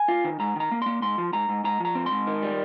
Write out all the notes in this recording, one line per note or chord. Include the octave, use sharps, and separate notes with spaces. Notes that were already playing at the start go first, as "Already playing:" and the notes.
Already playing: G#5
F4
D#3
G#2 A#5
D#3 A#5
A#3
A#3 C6
G#2 C6
F3
G#2 A#5
G#2
G#2 A#5
F3 A#5
C4
G#2 C6
D#3
G3